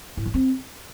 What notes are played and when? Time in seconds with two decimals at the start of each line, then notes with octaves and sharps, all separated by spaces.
0.17 A2
0.26 F3
0.34 C4